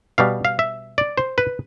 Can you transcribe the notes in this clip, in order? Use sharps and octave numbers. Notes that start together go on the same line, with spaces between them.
B2 G3 F5
F5
E5
D5
C5
B4